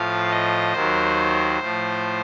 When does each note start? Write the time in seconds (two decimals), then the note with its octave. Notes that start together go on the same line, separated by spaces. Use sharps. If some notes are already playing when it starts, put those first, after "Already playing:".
Already playing: A2 F3 F5
0.30 D#5
0.72 D#2 D#3 F#3 C5
1.58 A2 F3